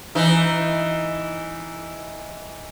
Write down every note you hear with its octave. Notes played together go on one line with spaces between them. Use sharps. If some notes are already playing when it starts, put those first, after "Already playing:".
E3 D#4